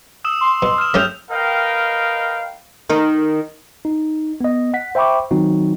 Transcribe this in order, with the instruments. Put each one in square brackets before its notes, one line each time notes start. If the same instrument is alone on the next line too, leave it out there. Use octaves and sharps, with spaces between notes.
[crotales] D#6 E6 E7
[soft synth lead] C6
[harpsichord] B2
[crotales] F6 E7
[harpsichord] A3 C#4 G4 [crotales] F6 G6 F7
[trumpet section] A#4 B4 D#5 F5 G5
[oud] D#3 D#4
[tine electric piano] D#4
B3 D#5
F#5 B6
C5 E5 G5 B5 C#6 D6
D#3 F#3 C4 D#4 F#4